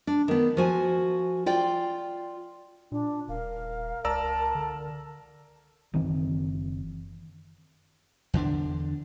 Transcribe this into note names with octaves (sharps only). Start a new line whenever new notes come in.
D4
D#3 B3
F3 F#4 G#5
F4 D5 G5
A#2 D4
D#1 A#4 F5
C#2 D5 A5 A#5 E6
D3
F#1 D#3 E3 C4
E2 D3 D4